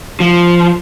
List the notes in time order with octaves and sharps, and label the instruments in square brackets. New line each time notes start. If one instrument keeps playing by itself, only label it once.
[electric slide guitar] F3